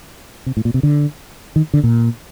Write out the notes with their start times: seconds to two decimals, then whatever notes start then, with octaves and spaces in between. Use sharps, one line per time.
0.46 C3
0.57 A2
0.65 A#2
0.74 C3
0.83 D3
1.56 D#3
1.74 D3
1.84 A#2